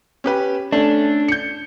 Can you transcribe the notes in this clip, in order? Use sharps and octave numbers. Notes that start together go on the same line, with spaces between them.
C#4 G4 B4
A3 C#4 D4
G6 C#7